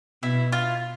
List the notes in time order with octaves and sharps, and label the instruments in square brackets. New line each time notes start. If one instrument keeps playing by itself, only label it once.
[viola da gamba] B2 [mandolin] E4
[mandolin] F4